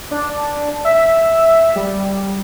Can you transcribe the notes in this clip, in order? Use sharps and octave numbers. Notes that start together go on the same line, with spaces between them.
D4
E5
G3